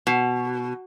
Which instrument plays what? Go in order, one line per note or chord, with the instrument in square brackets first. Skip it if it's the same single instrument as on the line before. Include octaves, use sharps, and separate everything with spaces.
[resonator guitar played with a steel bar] B2